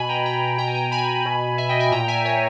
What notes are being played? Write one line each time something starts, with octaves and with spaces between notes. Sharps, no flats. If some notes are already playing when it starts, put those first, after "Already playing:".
Already playing: B2 G#5 B5
G5 A#5
G5 A#5
B2 G5 A#5
G#5
G5 A#5
G#5 B5
B2
E5 G#5
D#5 G5
E5 G#5
A#2 G5 A#5
E5 G#5
C#5